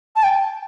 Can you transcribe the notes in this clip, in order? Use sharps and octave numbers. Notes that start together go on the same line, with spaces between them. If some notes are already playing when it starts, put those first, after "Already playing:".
A5
G5